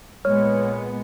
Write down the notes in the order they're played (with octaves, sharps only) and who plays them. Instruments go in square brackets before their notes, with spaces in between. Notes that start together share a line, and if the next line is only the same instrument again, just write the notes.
[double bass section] A#2 G#3 B3 [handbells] C#5 F6